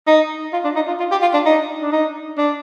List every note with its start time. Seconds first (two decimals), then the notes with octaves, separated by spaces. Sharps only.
0.07 D#4
0.53 F4
0.64 D4
0.76 D#4
0.87 F4
0.99 F4
1.11 G4
1.22 F4
1.33 D4
1.45 D#4
1.82 D4
1.92 D#4
2.38 D4